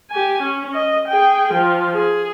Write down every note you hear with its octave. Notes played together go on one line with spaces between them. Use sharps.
G4 G#5
C#4
D#5
G#4 G5
F3
G#4